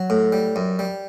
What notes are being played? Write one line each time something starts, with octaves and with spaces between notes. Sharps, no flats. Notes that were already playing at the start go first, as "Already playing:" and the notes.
Already playing: F#3
A2
G3
F#2
G3